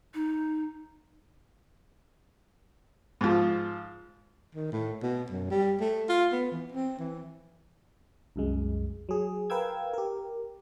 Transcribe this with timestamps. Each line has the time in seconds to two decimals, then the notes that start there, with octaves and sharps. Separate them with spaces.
0.14 D#4
3.21 G#2 F3
4.55 D#3
4.72 A2
5.03 B2
5.30 F#2
5.51 G3
5.80 A3
6.09 F4
6.32 B3
6.51 E3
6.72 C4
6.99 E3
8.36 C2 F#2 G#3
9.09 F#3 G#4
9.50 A#4 B4 F5 G5 E6 G#6
9.94 G4 A#4